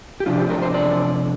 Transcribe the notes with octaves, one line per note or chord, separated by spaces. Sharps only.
G4
C3 F3 D4 F4
G4
A#4
C5
D5